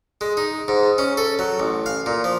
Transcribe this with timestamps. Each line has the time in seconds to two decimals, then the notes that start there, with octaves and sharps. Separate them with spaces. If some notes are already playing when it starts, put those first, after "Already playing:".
0.21 G#3
0.37 D#4
0.68 G#2
0.98 C#4
1.17 A4
1.39 F#3
1.60 A1
1.86 F5
2.06 A#2
2.24 F3